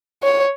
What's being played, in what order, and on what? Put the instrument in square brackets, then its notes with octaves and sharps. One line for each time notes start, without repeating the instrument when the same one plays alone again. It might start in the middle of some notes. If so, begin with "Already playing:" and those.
[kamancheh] C#5